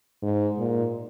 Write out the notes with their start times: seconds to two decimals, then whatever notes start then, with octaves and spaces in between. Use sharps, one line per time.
0.22 G#2
0.59 A#2